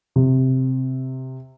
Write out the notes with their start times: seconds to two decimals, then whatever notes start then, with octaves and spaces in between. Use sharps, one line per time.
0.16 C3